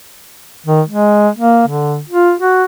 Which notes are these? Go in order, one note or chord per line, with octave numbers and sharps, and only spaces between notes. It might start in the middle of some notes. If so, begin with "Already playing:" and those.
D#3
G#3
A#3
D3
F4
F#4